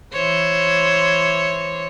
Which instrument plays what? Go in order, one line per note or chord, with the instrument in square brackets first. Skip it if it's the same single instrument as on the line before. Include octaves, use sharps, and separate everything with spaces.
[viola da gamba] E3 C5 C#5